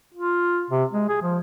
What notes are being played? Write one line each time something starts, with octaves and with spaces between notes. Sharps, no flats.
F4
C3
G#3
G#4
F3